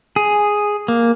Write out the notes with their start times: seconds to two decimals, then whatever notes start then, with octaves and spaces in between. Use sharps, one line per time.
0.16 G#4
0.88 A#3